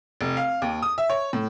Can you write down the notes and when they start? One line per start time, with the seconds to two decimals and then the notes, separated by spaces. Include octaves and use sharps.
0.21 F1
0.37 F5
0.62 D#2
0.82 D#6
0.98 E5
1.10 C#5
1.33 A2